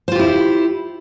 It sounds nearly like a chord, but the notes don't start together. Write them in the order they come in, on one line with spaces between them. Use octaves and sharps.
C5 F4 G4 E4